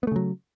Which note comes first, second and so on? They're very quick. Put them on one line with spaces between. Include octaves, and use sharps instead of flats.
B3 A3 C#3 F#3